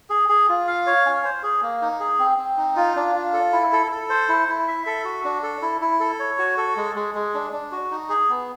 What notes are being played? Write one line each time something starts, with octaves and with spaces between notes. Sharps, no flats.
G#4
G#4
F4
F5
C#5
C#4
C5
G#4
A#3
D#4
G#4
C4
C4
D#4
F4
D4
F4
A4
E4
A4
A4
C5
E4
E4
E5
A4
F#4
D4
A4
E4
E4
A4
C#5
F#4
A4
G#3
G#3
G#3
D4
D4
F#4
D#4
G#4
B3